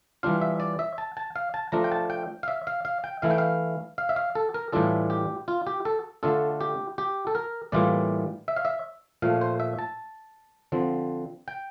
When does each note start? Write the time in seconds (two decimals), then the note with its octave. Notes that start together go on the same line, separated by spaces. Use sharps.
0.23 E3 G3 D4 F4 F5
0.41 E5
0.60 D5
0.79 E5
0.98 A5
1.17 A5
1.36 F5
1.54 A5
1.72 F3 A3 D4 F4 A#5
1.84 G5
1.92 A5
2.10 G5
2.43 F5
2.48 E5
2.67 F5
2.85 F5
3.04 G5
3.22 E3 A3 E4 F5
3.31 G5
3.38 F5
3.98 F5
4.09 E5
4.16 F5
4.35 A4
4.54 A#4
4.72 A2 E3 G3 D4 F4 A4
5.10 G4
5.48 F4
5.67 G4
5.85 A4
6.23 D3 A3 D4 F4 A4
6.61 G4
6.98 G4
7.27 A4
7.35 A#4
7.72 A2 E3 G3 A#3 F4 D5
8.48 E5
8.56 F5
8.65 E5
9.22 A#2 F3 A3 F5
9.41 C5
9.60 E5
9.79 A5
10.72 D3 F3 C4
11.48 G5